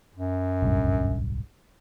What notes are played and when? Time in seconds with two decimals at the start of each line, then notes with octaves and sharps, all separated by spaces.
0.15 F#2
0.62 D1 B1 G2